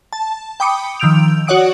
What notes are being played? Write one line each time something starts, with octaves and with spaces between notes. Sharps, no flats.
A5
G5 B5 D6 D#6 C#7
D#3 F3 E6 G6 D7 F7
F#4 C#5 D5 F#5 D#6 D7